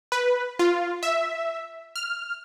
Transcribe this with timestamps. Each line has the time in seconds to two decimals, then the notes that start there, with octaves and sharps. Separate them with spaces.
0.12 B4
0.59 F4
1.03 E5
1.96 F6